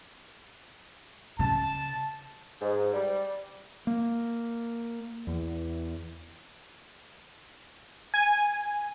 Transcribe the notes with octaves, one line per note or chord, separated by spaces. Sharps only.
C#3 A5
G#2
G3
A#3
E2
G#5